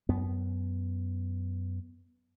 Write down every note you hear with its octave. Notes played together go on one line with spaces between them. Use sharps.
F#2 B3